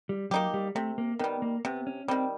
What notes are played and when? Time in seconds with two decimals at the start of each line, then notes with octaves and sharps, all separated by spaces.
0.09 G3
0.31 F#3 A#3 D#4 G4
0.54 G3
0.75 C3 A3
0.98 A#3
1.19 D#3 G3 B3
1.42 A#3
1.65 C3 B3
1.87 C#4
2.08 D#3 G3 C4